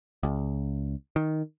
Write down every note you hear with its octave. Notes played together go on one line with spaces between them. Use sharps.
C#2
D#3